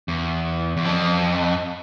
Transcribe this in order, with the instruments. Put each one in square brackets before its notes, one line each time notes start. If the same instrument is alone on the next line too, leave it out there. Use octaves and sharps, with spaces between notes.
[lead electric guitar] E2
E2
F2